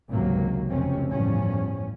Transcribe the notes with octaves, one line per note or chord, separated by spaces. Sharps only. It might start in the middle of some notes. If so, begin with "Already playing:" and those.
G#1 C#2 C3 F#3 A#3
F1 C#2 C3 C4 C#4
G1 E2 A2 F3 G3 C#4